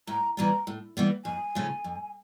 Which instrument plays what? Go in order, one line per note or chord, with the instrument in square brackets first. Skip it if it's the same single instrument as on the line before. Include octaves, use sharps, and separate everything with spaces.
[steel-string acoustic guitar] A2 [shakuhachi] A#5
[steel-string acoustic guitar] E3 G3 B3 [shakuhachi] A#5
[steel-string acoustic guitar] A2
E3 G3 B3
[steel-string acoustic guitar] F2 [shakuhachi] G#5
[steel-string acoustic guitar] C#3 F3 A3 C#4
F2